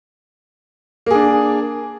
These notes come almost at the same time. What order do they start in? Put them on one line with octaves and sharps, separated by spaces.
A#3 G#4 D4